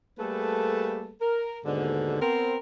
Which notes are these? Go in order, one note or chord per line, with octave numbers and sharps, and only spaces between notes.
G3 A3 A#3 G#4 A4 B4
A#4
D#2 G#2 B2 D3
B3 C4 A#4